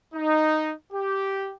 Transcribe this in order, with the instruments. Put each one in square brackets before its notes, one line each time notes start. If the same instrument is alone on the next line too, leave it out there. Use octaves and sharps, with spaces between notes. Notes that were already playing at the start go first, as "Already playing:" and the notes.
[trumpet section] D#4
G4